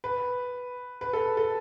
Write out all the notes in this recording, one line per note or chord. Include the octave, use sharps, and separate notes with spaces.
B4
B4
A4
A4